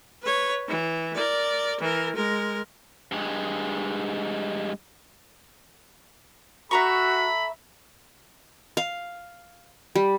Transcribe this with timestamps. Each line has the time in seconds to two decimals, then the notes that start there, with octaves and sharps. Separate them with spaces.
0.23 B4 C#5
0.68 E3
1.15 A#4 D5
1.80 E3 A#4
2.15 G#3 A#4
3.12 G2 G#3
6.71 F#4 A4 E5 A#5 B5 C#6
8.77 F5
9.95 G3